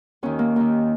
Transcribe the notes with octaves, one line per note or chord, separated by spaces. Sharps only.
D#2 D#3 C#4
A#3
D#2 D#3